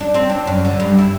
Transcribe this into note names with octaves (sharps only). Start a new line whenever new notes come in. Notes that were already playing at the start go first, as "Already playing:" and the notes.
D4
C4
D4
F#2
D3
G2
E4